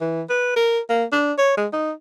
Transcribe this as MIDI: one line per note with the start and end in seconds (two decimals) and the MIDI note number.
0.01 0.22 52
0.29 0.51 71
0.56 0.79 70
0.89 1.04 58
1.12 1.33 62
1.38 1.53 73
1.57 1.67 56
1.73 1.92 63